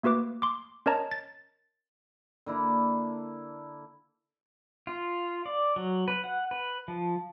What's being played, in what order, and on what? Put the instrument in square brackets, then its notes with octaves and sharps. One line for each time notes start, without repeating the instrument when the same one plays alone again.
[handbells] A3 A#3 F#4 B4 D6
C6 D6
C#4 A#4 C#5 D#5 A5 A#5
A6
[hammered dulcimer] D3 A#3 E4
[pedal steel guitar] F4
D5
F#3
B4
F#5
B4
F3